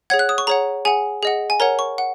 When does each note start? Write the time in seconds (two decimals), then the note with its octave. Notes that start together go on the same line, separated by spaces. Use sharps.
0.10 G#4 C#5 F#5 G#6
0.19 F#6
0.29 D#6
0.38 C#6
0.47 G#4 C#5 F#5 A#5
0.85 G#4 F#5 G#5
1.23 G#4 D#5 F#5
1.50 G#5
1.60 A#4 C#5 F#5 A#5
1.79 C#6
1.98 F#5